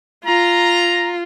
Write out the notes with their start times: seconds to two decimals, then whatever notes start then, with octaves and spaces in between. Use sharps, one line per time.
0.25 F4 A#5